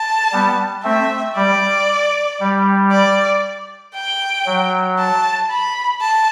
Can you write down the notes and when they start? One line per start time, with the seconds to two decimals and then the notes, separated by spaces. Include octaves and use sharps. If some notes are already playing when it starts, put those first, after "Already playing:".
Already playing: A5
0.32 G3 B3
0.84 A3 C4 E5
1.36 G3 D5
2.40 G3
2.92 D5
3.95 G5
4.46 F#3
4.99 A5
5.50 B5
6.01 A5